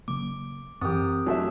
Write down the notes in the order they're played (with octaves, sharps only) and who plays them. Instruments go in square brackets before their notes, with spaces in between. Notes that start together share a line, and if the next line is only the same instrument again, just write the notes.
[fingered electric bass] C#3 F#3 A#3 [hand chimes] D6
[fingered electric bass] F#2 E3 [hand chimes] C4 [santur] G4 A#4 D#6
[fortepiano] F#3 A3 E5 [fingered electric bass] D4